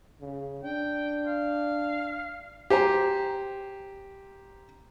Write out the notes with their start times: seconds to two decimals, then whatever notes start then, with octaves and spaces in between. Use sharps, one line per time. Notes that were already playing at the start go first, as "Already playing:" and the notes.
0.21 C#3
0.63 D4 G5
1.26 F5
2.70 G4 C5 G#5 A#5